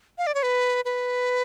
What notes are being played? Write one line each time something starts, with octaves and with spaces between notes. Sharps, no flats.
F5
D5
C#5
B4
B4